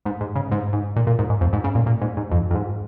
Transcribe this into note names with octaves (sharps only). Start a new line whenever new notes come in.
G#2
G#2
C#3
G#2
G#2
A#2
A#2
G#2
G#2
F2
G#2
C#3
A#2
A#2
G#2
G#2
F2
F2
G#2